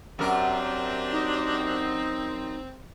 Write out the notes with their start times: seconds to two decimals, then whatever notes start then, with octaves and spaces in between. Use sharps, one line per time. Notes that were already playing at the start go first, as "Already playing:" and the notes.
0.19 F#2 C4 D4 G4 A#4
1.12 D#4